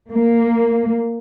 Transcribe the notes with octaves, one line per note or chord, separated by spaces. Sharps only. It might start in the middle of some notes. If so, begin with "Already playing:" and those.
A#3